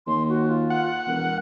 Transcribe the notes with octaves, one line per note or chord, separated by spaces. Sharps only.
D#2 C6
F#4
F4
F#5
E1 A#4